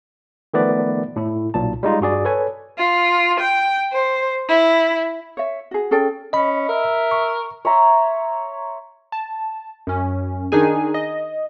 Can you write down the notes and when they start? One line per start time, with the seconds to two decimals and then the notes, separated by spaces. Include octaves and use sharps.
0.54 D#3 F3 A3 B3 B4 D5
1.16 A2 E4
1.54 B1 A#2 A5
1.83 G3 G#3 D#4 F4
2.01 G2 F#4 G#4 D5
2.25 A4 B4 C#5 G#5
2.78 F4
3.38 G5
3.92 C5
4.48 E4
5.37 C#5 E5
5.71 F#4 G#4
5.91 C#4 G#4 A4 G5
6.33 C#4 D#5 B5
6.69 A#4 E5
7.11 C#6
7.65 C#5 E5 A#5 C6
9.12 A5
9.87 F#2 C#4
10.52 D#3 D4 D#4 G#4 G#5
10.94 D#5